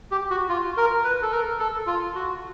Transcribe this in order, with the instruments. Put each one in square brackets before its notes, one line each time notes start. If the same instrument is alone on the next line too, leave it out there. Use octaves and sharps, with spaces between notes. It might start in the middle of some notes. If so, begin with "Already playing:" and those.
[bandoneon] G4
F#4
F4
A#4
B4
A4
A#4
A4
F4
F#4